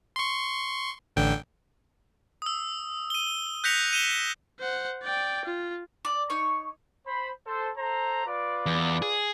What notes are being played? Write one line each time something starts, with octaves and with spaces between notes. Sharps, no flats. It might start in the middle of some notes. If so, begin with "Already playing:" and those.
C6 C#6
A1 D3 G5
D#6 E6
D#7 G7
F#6 G6 A#6 B6 C#7 F7
D#7 E7 G7
C5 F#5
D5 G5
F4
D5
D#4 C#5 C#6
C5 B5
A4 C5
A4 C5 A#5
F4 B4 D5
E2
G#4